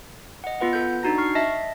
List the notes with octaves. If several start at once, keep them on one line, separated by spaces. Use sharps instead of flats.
D#5 F#5
B3 F4 B4 F#5
A4 B4 G6
D4 D#4 F#4 A#5 A#6
C#6 F6 C7
D#5 E5 A5 A#6